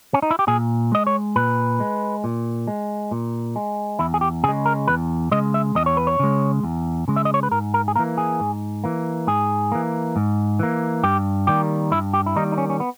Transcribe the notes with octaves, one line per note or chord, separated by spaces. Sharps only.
C#4
D#4
E4
G4
A#2 G#4
G#3 D#5
C#5
A#2 B4
G#3
A#2
G#3
A#2
G#3
E2 E4
G#4
G4
C#3 G#3 G#4
A#4
E2 B4
C#3 G#3 D#5
E5
E2 D#5
C#5
B4
C#5
C#3 G#3
E2
C#3 G#3
E5
D#5
C#5
B4
G#2 A#4
A#4
G#4
E3 A#3 A#4
G#4
G#2
E3 A#3
G#2 G#4
E3 A#3
G#2
E3 A#3
G2 G4
D#3 G3 A#3 G4
G2 E4
G4
E4
D#3 G3 A#3 D#4
D#4
C#4
C#4
B3